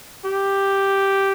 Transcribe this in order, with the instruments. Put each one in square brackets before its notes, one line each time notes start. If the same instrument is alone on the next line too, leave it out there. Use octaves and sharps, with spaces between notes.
[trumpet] G4